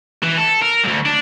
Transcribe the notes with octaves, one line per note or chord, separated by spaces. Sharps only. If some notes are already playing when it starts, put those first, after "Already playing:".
E3
A4
A#4
D2 G2
D4